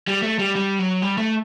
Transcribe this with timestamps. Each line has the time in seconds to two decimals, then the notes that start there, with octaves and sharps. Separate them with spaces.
0.08 G3
0.23 A3
0.39 G3
0.55 G3
0.79 F#3
1.02 G3
1.18 A3